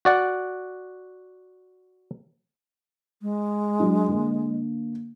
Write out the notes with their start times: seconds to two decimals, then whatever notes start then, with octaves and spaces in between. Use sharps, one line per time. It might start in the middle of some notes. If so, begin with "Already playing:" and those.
0.05 F#4 D5 F#5
3.22 G#3
3.79 F#3 D4
4.09 D3 A#3